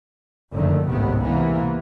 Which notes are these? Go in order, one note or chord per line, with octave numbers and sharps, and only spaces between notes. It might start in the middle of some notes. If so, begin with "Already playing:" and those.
F#1 F2 D3 D#3 A3
G#1 C#2 A2 C3 D#3 B3
C3 E3 A#3 B3